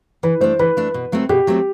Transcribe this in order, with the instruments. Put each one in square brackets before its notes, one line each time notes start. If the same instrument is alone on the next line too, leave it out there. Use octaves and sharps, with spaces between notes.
[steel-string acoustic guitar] E3 [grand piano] B4
[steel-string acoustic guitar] A3 D4 [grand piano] C5
[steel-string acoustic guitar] E3 [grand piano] B4
[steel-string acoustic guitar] A3 D4
B2
F#3 A3 C4
[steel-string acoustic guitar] B2 [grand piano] G4
[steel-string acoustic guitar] F#3 A3 C4